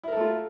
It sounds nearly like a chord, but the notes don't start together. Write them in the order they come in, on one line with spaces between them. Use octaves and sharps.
E4 A#4 A4 A3 F4